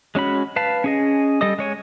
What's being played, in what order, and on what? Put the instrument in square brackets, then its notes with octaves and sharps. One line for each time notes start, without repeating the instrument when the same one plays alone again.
[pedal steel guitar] G#3 C#4 F#4 B5
B4 F5 A5
C#4 G#4 D#5
G3 A4 D#5 D#6
G#3 C#5 G#5